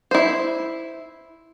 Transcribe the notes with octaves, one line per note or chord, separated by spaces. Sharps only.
E4 C5